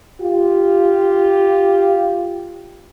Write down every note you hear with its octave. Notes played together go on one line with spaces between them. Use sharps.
F4 G4